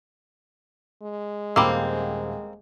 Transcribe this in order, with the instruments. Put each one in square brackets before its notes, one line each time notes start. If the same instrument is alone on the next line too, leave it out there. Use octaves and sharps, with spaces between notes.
[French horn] G#3
[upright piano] D#1 [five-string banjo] A#3 C4 [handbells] B5 D6 E6